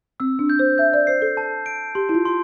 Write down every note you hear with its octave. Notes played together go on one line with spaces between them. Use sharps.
C4 E6
D4
G6
C5
E5 G6
D5
C5 C7
A4
A5
D7
G4 C6
E4
F4
C6